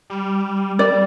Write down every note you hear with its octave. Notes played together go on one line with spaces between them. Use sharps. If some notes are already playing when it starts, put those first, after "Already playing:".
G3
G3 D5